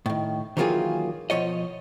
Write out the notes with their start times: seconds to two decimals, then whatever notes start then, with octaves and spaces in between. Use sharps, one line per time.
0.06 A2 D#3
0.57 D#3 E3 F#3 A#3 F4 G#4
1.30 B2 F3 C#5 D#5